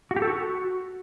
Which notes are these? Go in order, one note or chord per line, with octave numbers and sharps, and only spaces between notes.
F#4
G4
A4
F#4